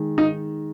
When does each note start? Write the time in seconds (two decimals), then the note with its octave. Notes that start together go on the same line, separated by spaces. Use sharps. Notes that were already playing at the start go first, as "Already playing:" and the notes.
Already playing: D#3 G#3
0.18 D#4